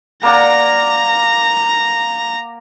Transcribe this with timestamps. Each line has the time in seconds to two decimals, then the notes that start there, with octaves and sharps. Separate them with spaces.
0.23 A#3 D5 F#5 A#5 A#6